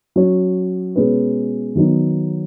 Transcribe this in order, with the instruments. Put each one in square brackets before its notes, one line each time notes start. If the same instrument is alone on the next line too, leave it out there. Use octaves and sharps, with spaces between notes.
[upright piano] F#3 C#4 F#4 C#5
B2 G#3 C#4 B4
D#3 F#3 B3 D#4